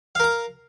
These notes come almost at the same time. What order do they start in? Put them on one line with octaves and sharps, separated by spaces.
F5 A#4 A#5